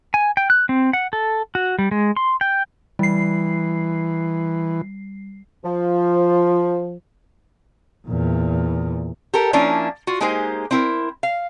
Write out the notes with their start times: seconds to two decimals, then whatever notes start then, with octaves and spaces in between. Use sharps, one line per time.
0.14 G#5
0.37 G5
0.50 F#6
0.69 C4
0.93 F#5
1.13 A4
1.55 F#4
1.79 G3
1.91 G#3
2.17 C6
2.41 G5
2.99 E3 G3 C7
5.64 F3
8.08 E2 A#2
9.34 G4 A4 A#4
9.53 F3 A#3 C#4 D4 E4
10.07 F4 F#4
10.20 G#3 A#3 D#4 G4 G#4 C5
10.71 C4 E4 A#4
11.23 F5